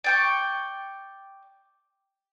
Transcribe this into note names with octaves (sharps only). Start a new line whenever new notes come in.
D5 G5 C#6